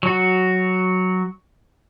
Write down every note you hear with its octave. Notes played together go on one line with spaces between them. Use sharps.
F#3 F#4